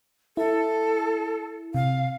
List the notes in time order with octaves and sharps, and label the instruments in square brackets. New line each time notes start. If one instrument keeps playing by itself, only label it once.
[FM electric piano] E4 [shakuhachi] A4
[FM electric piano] C3 [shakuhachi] F5